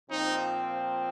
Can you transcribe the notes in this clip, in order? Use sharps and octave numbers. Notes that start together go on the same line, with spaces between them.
A#2 F3 C4 D#4